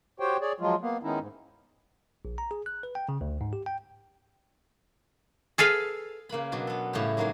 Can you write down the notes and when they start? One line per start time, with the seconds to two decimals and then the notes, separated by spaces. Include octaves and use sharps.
0.20 F#4 G4 C5 C#5 G5
0.41 G#4 C#5 D5
0.60 F3 F#3 G#3 F4
0.81 A#3 B3
1.03 D#3 G#3 B3 C#4 D#4 E4
1.19 G#2
2.25 A#1
2.38 A#5
2.51 G#4
2.66 F#6
2.83 B4
2.95 G5
3.09 C#3
3.21 D2
3.41 G#2
3.53 G4
3.66 G5
5.58 G#4 A4 B4 F5
6.29 C#3 A#3 B4 B5
6.52 B2 F#3 D4
6.67 B3 A4
6.93 A2 C#3 G3 E4 F#4 G4
7.17 G#2 F#3 A#3 F#4 G#4